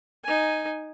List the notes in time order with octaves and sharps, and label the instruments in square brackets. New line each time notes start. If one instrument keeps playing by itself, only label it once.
[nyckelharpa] D#4 G#5